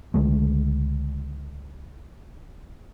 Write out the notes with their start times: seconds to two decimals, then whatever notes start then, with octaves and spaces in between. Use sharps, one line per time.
0.14 C#2 D3 G#3 A3